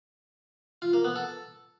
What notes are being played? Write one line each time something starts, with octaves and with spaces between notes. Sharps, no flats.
F4
A#3
B3
A4